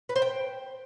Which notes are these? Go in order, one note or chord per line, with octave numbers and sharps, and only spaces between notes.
B4
C5
G5